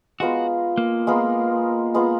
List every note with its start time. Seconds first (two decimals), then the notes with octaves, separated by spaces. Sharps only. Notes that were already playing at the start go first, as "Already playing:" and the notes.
0.20 G#3 B3 F4 F#4 A#4
0.78 A#3
1.07 G#3 B3 F4 A#4
1.94 G#3 B3 F4 A#4